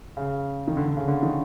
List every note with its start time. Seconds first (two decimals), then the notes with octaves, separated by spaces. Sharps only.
0.17 C#3
0.68 D#3
0.77 D3
0.87 D3
0.97 C#3
1.08 D3
1.23 D#3